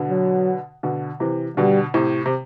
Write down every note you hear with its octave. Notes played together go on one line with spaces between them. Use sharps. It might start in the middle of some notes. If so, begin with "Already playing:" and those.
Already playing: B2 D3
F#3
B2 D3
C3 E3
B2 D3 G3
A2 C3
C3